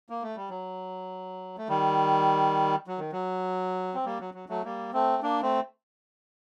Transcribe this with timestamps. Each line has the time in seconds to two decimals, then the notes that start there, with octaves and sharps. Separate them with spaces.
0.10 A#3
0.22 A3
0.36 G3
0.50 F#3
1.58 A3
1.69 D#3 G3
2.87 F#3
2.99 D#3
3.12 F#3
3.94 C4
4.05 G3 A#3
4.20 F#3
4.34 F#3
4.49 F#3 A3
4.64 G3 A#3
4.93 A3 C4
5.23 A#3 D4
5.42 A3 C4